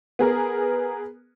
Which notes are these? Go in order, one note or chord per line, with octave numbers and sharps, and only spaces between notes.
B3 G#4 A#4